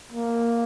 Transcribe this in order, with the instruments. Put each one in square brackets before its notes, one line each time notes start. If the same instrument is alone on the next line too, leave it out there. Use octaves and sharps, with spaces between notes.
[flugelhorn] A#3